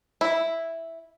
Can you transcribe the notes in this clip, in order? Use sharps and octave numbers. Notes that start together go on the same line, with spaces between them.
E4